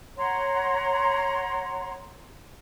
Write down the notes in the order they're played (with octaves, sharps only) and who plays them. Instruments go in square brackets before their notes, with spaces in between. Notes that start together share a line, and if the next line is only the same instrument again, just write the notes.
[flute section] C#5 F#5 A#5 C6